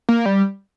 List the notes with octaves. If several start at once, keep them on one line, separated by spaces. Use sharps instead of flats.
A#3
G3